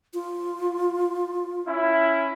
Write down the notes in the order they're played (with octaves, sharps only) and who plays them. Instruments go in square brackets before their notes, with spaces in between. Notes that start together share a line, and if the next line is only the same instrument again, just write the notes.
[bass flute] F4
[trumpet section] C#4 E4